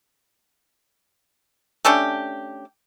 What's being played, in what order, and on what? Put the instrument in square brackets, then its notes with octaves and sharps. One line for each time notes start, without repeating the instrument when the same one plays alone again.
[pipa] A3 C#4 D4 G4